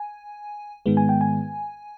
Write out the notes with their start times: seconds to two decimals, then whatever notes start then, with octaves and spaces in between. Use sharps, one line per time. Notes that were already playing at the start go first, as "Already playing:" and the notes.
Already playing: G#5
0.86 G#2 D#3 G#3 B3
0.97 G#5
1.09 G5
1.21 G#5